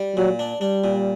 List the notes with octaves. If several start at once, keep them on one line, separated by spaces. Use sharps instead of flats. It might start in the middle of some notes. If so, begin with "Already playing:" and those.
Already playing: G3
A#2 F#3
D4
G3 D4
A#2